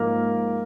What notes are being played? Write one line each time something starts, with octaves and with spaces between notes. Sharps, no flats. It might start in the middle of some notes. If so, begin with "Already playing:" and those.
Already playing: G#2 F3 G#3 A#3 A#4